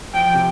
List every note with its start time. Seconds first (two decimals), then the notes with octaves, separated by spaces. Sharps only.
0.14 F3 G5
0.34 C3